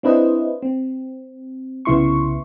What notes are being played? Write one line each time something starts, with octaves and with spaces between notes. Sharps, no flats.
C4 D4 E4 B4 C5 D#5
C4
C2 C#3 B3 E4 C6 C#6